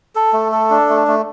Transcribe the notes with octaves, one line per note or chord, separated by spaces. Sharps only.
A4
A3
A4
D4
A3
A3